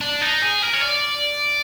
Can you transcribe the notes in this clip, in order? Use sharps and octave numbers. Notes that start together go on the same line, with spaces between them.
D4
D#4
G#4
A#4
C#5
D5